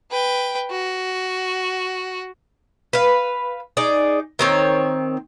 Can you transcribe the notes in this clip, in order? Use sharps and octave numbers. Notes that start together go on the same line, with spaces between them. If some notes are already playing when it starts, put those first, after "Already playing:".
B4 G5
F#4
B4 F5
D#4 G#4 D5
D#3 C4 C#5